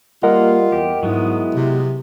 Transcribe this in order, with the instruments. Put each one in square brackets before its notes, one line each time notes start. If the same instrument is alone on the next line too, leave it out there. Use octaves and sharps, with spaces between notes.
[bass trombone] G3 [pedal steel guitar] A#3 [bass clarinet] F4 [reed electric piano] A#4 D#5 F#5
[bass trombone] E2 [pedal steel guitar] G4
[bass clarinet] G#2 [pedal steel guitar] F#3 G#3 B3 [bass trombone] E4
[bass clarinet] C3